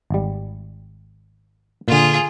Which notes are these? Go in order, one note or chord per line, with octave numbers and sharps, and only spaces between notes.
G#1 G3
A#2 D3 F4 G#4